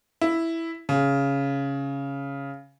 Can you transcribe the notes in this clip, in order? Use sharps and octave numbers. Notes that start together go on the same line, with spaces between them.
E4
C#3